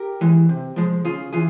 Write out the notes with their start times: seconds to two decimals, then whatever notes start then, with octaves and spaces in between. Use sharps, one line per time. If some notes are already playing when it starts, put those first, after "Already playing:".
Already playing: G4 A#4
0.21 E3 G#3
0.49 C3
0.76 F3 G#3
1.05 C#3 F4 G#4
1.33 E3 F4 G#4